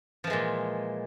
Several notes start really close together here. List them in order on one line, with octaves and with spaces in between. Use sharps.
F3 E3 G#3 A#2